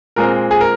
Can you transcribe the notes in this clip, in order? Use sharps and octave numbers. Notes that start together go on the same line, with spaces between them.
A#2 G#3 C4 A#4
G#4
A#4